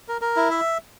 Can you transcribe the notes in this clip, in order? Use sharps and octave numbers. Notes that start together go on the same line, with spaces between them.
A#4
A#4
E4
E5